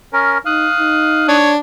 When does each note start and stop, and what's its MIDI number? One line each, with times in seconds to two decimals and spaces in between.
0.13 0.38 61
0.13 0.38 70
0.46 0.69 63
0.46 1.25 77
0.46 1.37 87
0.46 1.37 90
0.80 1.43 63
1.28 1.58 62
1.28 1.51 73